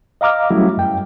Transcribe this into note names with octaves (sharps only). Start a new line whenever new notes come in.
D#5 F5 A#5 D6 F6
F#3 G3 A3 C#4 E4 F#4
F#2 G5